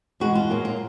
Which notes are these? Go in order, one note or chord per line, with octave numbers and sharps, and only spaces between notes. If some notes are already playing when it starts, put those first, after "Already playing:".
E2 B2 G#3 F#4
F4
A#2 F#3 A#3
F4